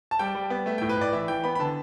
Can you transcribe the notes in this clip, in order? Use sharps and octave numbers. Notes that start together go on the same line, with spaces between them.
A5
G3 G5
G3
B3
A3 E5
A2 G5
B4
A2 D5
E3 E5
E3 G5
B3 B5
B5
D3 A5